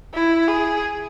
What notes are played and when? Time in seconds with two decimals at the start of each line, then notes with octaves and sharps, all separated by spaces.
0.13 E4
0.48 G#4